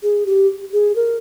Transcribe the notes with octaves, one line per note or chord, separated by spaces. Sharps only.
G#4
G4
G#4
A#4